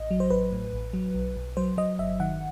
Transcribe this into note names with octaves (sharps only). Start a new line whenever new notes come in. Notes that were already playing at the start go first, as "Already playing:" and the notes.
Already playing: A1 D#5
F#3
C5
A1 B4
A2
A1
F#3
B1
B1
F#3 C5
F#3 D#5
G1 E5
D#3 F#5